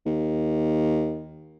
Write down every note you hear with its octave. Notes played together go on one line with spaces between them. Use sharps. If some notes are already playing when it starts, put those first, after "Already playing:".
D#2